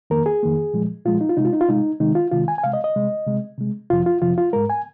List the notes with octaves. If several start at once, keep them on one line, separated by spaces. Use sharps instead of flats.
F2 D#3 A#3 A#4
G#4
F2 D#3 A#3
A#2 F3 G#3
A#2 F3 G#3 F4
D#4
F4
C3 G#3 D#4
F4
D#4
F4
C3 G#3 D#4
C3 D#3 G#3 D#4
F4
C3 D#3 G#3 F4
G#5
G#5
C3 G#3 F5
D#5
D#5
C3 G#3
C3 G#3
C3 G#3
F2 C3 F3 F4
F4
F2 C3 F3 F4
F4
G#2 G#3 A#4
G#5